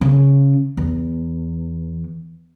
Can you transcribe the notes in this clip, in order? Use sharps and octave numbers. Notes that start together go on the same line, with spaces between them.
C#3
E2